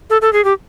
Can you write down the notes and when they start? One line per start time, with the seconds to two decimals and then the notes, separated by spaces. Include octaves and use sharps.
0.10 A4
0.22 A4
0.33 G#4
0.45 G4